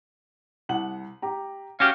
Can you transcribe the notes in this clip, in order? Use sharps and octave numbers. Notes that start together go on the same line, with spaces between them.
C2 F#5 F#7
G4 A#5
C#4 F#4 G4 F5